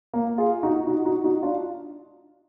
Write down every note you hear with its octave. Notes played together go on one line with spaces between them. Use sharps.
A#3
F4 G#4
D#4 F#4
D#4 F#4
D#4 F#4
D#4 F#4
D4 F4